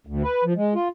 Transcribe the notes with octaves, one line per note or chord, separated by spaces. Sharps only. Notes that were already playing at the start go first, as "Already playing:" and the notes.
D2
B4
F3
G#3
F4